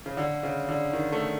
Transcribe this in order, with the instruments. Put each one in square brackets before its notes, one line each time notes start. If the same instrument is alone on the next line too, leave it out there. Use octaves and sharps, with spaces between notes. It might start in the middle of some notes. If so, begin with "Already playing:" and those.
[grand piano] C#3
D3
C#3
D3
D#3
A3